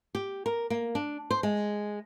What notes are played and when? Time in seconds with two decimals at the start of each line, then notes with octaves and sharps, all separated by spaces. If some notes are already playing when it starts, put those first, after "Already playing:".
0.15 G4
0.46 A#4
0.70 A#3
0.95 D4
1.31 C5
1.43 G#3